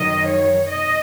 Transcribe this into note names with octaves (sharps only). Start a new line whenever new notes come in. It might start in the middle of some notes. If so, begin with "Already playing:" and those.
Already playing: F#2 D#3 F#3 D#5
C#5
D#5